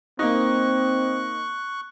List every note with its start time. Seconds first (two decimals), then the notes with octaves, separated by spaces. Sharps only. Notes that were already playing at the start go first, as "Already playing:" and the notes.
0.19 A#3 C4 D#4 C#6 F#6